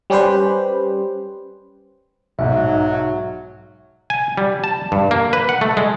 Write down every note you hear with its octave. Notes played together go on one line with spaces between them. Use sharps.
G3 C#4 G4 B4 C5
B1 G#2 F#3 E5
G#5
G3
A5
G2
A#3
B4
F#5
A3
G#3